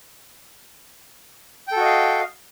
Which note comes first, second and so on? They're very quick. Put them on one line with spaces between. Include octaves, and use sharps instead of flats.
G5 A4 F#4 D#5 F5